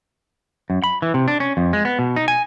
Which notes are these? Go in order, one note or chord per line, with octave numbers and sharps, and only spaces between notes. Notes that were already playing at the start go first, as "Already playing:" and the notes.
F#2
B5
E3
C3
D4
C#4
F2
G#3
B3
B2
D#4
G#5